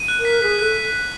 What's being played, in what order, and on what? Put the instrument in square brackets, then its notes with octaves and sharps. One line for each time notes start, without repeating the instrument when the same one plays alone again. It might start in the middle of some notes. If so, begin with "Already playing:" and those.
Already playing: [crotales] D#7
F#6
[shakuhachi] A#4
[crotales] B6
[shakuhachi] G#4 [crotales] B6
[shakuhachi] A4 [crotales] F#6